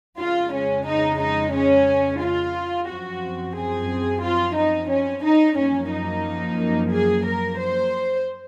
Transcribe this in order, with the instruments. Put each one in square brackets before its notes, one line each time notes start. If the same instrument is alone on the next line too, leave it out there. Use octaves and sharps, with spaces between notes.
[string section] F2 C#3 G#3 F4
C#4
D#4
D#4
C#4
F4
F#2 F3 C4 F#4
G#4
F4
D#4
C#4
D#4
F#2 F3 A#3 C#4
D#4
G#4
A#4
C5